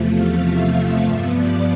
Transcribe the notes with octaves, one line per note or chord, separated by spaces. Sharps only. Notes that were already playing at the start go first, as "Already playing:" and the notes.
Already playing: E2 C3 F3 A3
F5
E5
G2 F3 B3 E5
D5